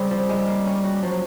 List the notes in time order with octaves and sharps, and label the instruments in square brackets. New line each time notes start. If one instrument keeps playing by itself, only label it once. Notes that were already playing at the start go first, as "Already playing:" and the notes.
Already playing: [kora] C#3 C4 [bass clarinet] G3
[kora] F3
G#3
A#3
C#4
F#4
[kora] F3 [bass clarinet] F#3